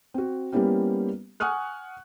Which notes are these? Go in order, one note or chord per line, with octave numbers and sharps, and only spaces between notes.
C4 F#4
G3 A#3 B3 C#4 E4 G4
F#5 G#5 C#6 D#6 F6 F#6